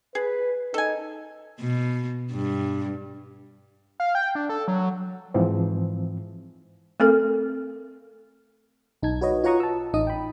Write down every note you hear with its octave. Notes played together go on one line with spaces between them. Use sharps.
G#4 B4
D#4 A4 G#5
B2
G2
F5
G5
D4
A4
F#3
G#2 E3 F3 C4
A3 C4 A4 A#4
B1 D#4 A5 G#6
F#4 B4 C#5 D#5
F4 C#5 F#5 A#5 C#6 D#6
A5 E6
A1 D#4 D#5 D#6
G5 B5